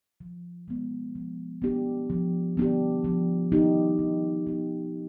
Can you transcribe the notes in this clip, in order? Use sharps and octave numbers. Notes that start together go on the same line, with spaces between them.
F3
G#3 B3
F3
B3 D4 G4
F3
B3 D4 G4
F3
B3 D#4 G4
F3
B3 D#4 G4